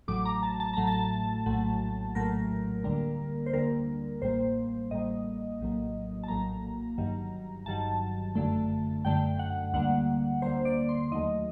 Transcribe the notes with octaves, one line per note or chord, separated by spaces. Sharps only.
A1 A2 F#3 A3 D6
A#5
A5
A5
A1 A2 F#3 A3 A#5
A5
A#1 A2 F#3 A3
A#1 A2 F#3 A3 A#4
D2 D3 G3 A#3
C5
D2 D3 G3 A#3 A#4
A1 A2 G3 A#3 C5
A1 A2 G3 A#3 D#5
A#1 A2 F#3 A#3
A5
A#1 A2 F#3 A#3 A#5
G1 G2 D#3 F#3
G1 G2 D#3 F#3 A5
G1 F#2 D3 A3
G1 F#2 D3 A3 G5
F#5
D2 D3 G3 A#3 F#5
D2 D3 G3 A#3 C5
D5
C6
D#2 D#3 F#3 A3 D#5